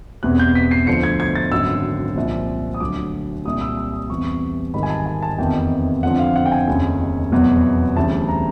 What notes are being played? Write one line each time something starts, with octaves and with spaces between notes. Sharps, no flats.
E1 E2 C3 F#6
G6
B6
C7
D2 D3 F3 C#7
G#6
G#6
A6
G#1 F#2 D3 F#3 E6
C2 A#2 F3
D#6
D2 D3 F#3 D6
C2 A#2 G3 D#6
E6
E6
D#6
E2 C3 E3 G3 C#6
G#1 G#2 D#3 G3 B5
G#5
A5
G#5
A5
F1 E2 C3 D#3 G5
F2 D3 F3 F#5
F5
F#5
G5
G#5
F1 D#2 C#3
F1 E2 B2 F#3
D2 C#3 E3 G3 A5
A#5